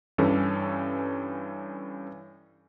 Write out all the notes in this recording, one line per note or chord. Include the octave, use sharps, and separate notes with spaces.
G2 E3 C#4 A4